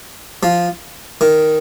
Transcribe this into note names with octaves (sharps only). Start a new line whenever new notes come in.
F3
D#3